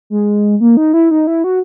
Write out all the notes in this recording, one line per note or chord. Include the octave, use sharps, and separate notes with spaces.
G#3
A#3
D#4
E4
D#4
E4
F#4